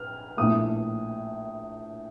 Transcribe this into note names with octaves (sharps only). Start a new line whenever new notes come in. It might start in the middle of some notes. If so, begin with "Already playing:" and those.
Already playing: F6
A#1 A2 A3 D#6